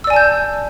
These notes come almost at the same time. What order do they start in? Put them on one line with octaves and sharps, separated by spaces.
E6 D5 G#5 A5 G6